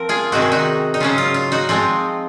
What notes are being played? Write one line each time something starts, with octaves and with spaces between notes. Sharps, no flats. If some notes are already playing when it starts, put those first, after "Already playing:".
Already playing: F3 C4 A#4
F4 G#4
C3 D#3 G#3 C4 F#4
G#4
D#4 F#4
D#4
C#3 F#3 C#4 F4
F4
F4
D#4 F#4
F3 G#3 C4 F4